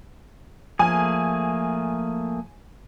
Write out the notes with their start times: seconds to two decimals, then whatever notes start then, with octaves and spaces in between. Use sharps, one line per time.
0.79 F3 A3 A#3 G#4 G#5